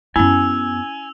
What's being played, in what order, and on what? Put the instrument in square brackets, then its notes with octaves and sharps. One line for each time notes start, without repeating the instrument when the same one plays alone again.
[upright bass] F#2 B3 [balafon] C#4 E4 [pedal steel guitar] G#5 [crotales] E6 F7